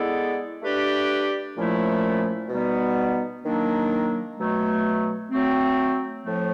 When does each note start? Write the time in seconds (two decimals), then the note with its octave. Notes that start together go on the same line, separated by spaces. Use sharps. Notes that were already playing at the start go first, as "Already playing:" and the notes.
Already playing: G#3 B3 E4 A4 D5
0.62 A3 D4 G4 B4 D5
1.55 A#2 F3 A3 C#4 E4
2.49 B2 G3 B3 D#4
3.43 D#3 F#3 A#3 D4
4.37 B2 F#3 A3
5.31 F#3 A3 C4
6.24 A2 F3 A3